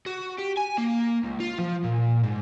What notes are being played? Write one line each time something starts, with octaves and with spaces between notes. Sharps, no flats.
F#4
G4
G#5
A#3
C#2
F4
F3
A#2
G#2